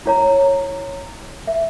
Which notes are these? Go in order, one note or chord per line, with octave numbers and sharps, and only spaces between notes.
E4 C#5 A#5
E5